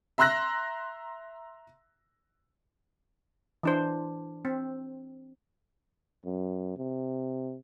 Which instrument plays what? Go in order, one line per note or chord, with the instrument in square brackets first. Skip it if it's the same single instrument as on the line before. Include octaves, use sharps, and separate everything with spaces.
[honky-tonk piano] E5 A#5 C6 E6 F#6 A#6
[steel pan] E3 D4 C5
C4
[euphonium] F#2
C3